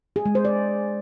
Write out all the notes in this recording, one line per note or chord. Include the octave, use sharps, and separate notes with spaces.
G#4
G#3
C5
D5